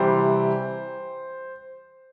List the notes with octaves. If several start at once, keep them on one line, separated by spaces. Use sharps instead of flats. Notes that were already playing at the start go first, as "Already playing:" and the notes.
Already playing: C3 E3 G3 C5